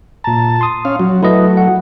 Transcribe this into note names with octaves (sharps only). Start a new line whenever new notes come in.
A#2 A5 A#5
C6 D#6
C#4 F5
F#3
F#3 A3 E4 B4 D#5
F#5